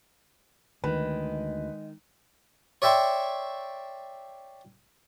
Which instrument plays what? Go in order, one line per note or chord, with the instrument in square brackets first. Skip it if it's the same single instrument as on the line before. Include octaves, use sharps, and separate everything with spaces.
[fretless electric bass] D2 [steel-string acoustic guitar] D#3 [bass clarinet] G#3 [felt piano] B4
[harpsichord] C#5 D5 E5 G5 C6 C#6